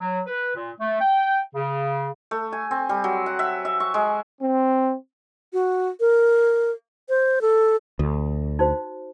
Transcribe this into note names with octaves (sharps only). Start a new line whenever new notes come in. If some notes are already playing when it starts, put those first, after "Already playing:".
F#3
B4
A#2
A3
G5
C#3
A3
G#5
C4
G3
F#3
F#5
E5
E5
C#6
G#3
C4
F#4
A#4
C5
A4
D2 A4
D#4 F#4 C5